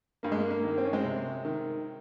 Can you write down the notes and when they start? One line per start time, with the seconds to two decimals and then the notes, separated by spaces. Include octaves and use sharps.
0.23 G2 A#3
0.32 G#3
0.40 A#3
0.51 A#3
0.64 D#3
0.78 C4
0.85 C#4
0.93 G#3 C4
1.04 C3
1.45 D#3